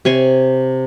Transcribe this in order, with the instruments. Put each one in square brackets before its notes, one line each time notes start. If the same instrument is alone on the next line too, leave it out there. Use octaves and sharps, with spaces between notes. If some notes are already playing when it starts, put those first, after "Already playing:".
[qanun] C3 C#5 G#5 C6